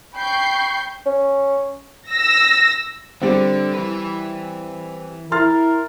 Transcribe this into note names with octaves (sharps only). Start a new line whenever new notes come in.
G5 B5 C#6 G6 C7
C#4
E6 A#6
D3 G3 C4
E3 B4
E4 A#4 C6 F6 A6